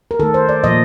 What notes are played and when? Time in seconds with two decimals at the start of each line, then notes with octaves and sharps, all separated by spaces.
0.11 A#4
0.20 D#3 A3 A4
0.34 C5
0.49 D5
0.64 A#2 F3 A#3 D#5